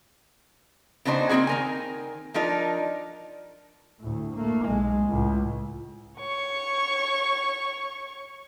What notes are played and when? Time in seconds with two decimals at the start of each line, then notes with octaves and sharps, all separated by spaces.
1.05 C#3 B3 D4 D#4 F#4 C5
1.29 A#3 C4 E4 F#4 G#4
1.47 D#3 A#4 G#5
2.34 F3 D4 D#4 F4 A#4
4.00 D2 A2
4.36 A3 A#3
4.66 B1 G#3
5.07 C#2 A2
6.18 C#5 C#6